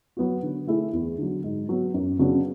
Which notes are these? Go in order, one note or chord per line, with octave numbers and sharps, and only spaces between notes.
F#3 B3 F#4
D3
A3 E4 G#4
E2
D3 F#3
G#2
F#3 B3
F#2
C#3 F#3 B3 D4